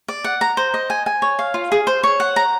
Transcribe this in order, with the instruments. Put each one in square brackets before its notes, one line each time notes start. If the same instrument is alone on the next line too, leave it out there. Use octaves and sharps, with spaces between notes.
[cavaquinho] D5
F#5
A#5
C5
D#5
G#5
G#5
C#5
F5
F4
G#4
C5
C#5
F#5
A#5